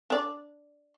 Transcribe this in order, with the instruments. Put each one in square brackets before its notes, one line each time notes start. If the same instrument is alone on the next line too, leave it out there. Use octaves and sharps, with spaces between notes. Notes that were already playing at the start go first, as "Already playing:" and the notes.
[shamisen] D4 D5